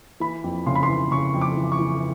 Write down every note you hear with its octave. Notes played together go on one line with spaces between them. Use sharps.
E3 B5
F2
C#3 C6
B5
C6
E3
C#3 C#6
F2
D6
E3
C#6
E3